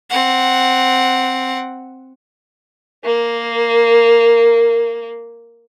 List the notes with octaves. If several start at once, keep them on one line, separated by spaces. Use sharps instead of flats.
C4 F#5
A#3 A#4